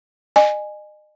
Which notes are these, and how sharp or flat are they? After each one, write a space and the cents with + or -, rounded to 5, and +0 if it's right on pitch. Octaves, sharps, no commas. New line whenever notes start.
D#5 -35 G#5 +0